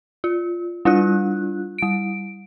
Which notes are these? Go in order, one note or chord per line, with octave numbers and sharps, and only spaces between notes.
F4
G3 D4 F4 F#6
G3 D7